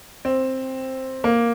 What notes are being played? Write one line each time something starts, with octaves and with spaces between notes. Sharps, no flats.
C4
A#3